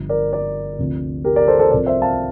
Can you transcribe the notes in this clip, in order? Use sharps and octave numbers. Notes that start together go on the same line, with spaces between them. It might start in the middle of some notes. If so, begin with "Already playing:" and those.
Already playing: G1 G2 F3
A#4 D5
A#4 D5
D2 C3 F3
G4 A#4
A#4 D5
A4 C5
A4 C5
C2 C3 F3 A#4 D5
C5 E5
F5 A5